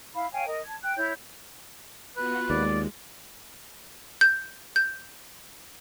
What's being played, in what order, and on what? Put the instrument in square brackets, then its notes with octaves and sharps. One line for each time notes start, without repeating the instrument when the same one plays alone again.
[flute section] E4 F5 B5
C#5 F5 G5 G#5
A#4 D#5
A5 G#6
G5 F#6
E4 C#5 G6
[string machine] B3 F4 F#4 [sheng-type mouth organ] B4
[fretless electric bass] D#2 [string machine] G#3 [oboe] D5
[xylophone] G6
G6